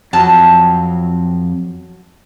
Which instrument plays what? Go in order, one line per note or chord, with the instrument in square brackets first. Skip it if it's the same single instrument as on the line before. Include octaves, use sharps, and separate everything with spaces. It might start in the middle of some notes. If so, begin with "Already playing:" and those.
[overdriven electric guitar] F2 [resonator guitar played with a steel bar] F#3 A5